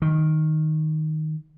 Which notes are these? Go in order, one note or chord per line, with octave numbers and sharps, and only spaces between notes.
D#3